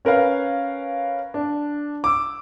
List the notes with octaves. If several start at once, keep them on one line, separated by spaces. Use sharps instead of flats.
C#4 A#4 B4 F5
D4
D6 E6